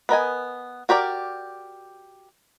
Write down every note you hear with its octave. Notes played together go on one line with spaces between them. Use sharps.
B3 A#4 D#5 G#5
F#4 G4 A#4 D5